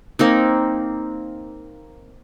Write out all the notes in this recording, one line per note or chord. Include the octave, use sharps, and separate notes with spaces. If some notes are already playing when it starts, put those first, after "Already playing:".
A#3 C4 D#4